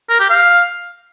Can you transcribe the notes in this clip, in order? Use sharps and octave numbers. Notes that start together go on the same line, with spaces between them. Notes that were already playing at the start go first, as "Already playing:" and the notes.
A#4
G4
F5